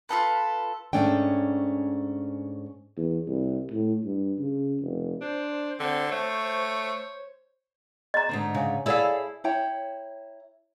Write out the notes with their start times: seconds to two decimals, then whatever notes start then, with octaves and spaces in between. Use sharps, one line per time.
0.09 F4 G#4 A4 B4
0.93 G#2 B2 A3 C#4 D4 G5
2.97 E2
3.27 C2
3.71 A2
4.05 G2
4.39 C#3
4.82 F1
5.21 D4 C5
5.80 D3 C4
6.11 A3 C#5
8.14 D#5 A#5
8.29 G#2 D3 C4
8.55 C#3
8.86 E4 G#4 A4 C#5 D5 F5
9.44 E4 C#5 G5 A#5